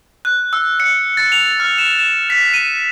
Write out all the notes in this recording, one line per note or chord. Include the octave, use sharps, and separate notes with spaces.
F#6
E6
C#7
A6
F7
F6
E7
E7
B6
D#7